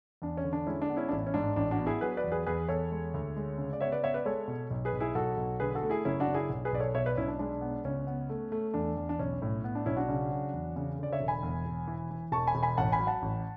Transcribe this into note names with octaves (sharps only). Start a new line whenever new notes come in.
E2 D4
C#4
D3
D4
G#3 C#4 E4
D4
B3
C#4 E4
D4
A1 C#4 E4
C#4
G#2 D4
A1 D4
D4 F#4
B3
E4 G#4
F#3 G#4 B4
B4 D5
E2
G#4 B4
E2 G#4 B4
E2 A4 C#5
G#3
D2
G#3
C#3
D5
B3 C#5 E5
B4 D5
B3 C#5 E5
B4 D5
G#3 A4 C#5
B2
B1
G#4 B4
B1
E4 G#4
B1 F#4 A4
B1
D3 G#4 B4
F#4 A4
A3
E4 G#4
F#1 C#4 E4
D4 F#4
F#1
E4 G#4
B1
G#4 B4
B1 D5
A4 C#5
B2 C#5 E5
B4 D5
B1 C#4 E4
D4
G#3 D4
B3
C#2 C#4
B3
A3
A3
E2 D4
E2
D4
B1 C#4
A2
B3
D4
B1 C#4 E4
D4 F#4
C#3
F#3
E2
C#3
D3 D5
C#5 E5
E1
G#5 B5
E2
E1
E3
E3
E1 A5 C#6
G#5 B5
E1
G#5 B5
A1 F#5 A5
G#5 B5
F#3
F#5 A5
A1